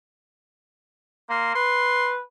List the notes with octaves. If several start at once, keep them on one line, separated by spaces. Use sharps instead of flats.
A#3 C6
B4 C6